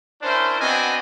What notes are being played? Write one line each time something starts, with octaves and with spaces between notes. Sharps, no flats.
C#4 D4 E4 A#4 C5
B3 C4 D4 F#4 D#5 G#5